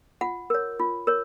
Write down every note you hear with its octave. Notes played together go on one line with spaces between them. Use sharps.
F4 F#5
A#4 C#5
F4
A#4 C#5